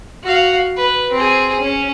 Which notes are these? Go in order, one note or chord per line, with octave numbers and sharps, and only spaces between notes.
F#4 F5
B4
C4 G#4
C#4